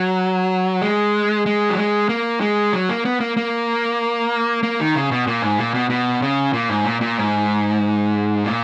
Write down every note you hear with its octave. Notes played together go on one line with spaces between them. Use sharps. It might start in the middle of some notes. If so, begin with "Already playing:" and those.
Already playing: F#3
G#3
G#3
F#3
G#3
A#3
G#3
F#3
A#3
B3
A#3
A#3
A#3
D#3
C#3
B2
A#2
G#2
A#2
B2
B2
C#3
A#2
G#2
A#2
A#2
G#2
A#2